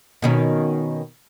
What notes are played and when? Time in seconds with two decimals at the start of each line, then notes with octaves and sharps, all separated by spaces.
0.22 B2 D#3 C#4